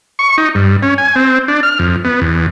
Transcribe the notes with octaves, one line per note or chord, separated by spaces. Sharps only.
C#6
D#4
G2
C#4
G#5
C4
D4
F6
F2
B3
E2